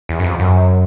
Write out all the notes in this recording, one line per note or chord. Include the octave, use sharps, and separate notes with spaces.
E2
F#2
F2
F#2